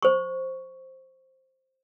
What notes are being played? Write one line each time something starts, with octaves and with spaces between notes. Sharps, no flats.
C5 C#6